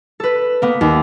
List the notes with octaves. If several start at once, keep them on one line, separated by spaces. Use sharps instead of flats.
A4 B4
A#3 B3
D#2